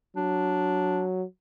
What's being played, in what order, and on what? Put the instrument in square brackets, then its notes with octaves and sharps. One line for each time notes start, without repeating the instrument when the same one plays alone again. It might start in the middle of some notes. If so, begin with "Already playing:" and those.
[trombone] F#3 [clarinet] D4